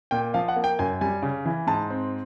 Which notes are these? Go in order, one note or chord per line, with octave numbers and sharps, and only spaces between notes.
A#2 G5
F3 F5
F#5
A#3
G5
F#2 G#5
G3 G#5
C#3
E3
G#2 A5
C4